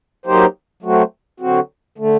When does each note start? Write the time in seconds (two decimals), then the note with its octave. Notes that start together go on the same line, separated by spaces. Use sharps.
0.26 F#3 A#3 D#4 G4 C5
0.82 F#3 A3 C4 F#4
1.40 D3 F#3 C4 F#4
1.98 D3 A3